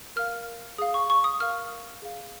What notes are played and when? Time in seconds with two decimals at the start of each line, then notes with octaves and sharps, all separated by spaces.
0.16 A#4 F5 F6
0.78 G#4 F5 D#6
0.94 C#6
1.10 C#6
1.24 D#6
1.40 A#4 F5 F6
2.02 G#4 F5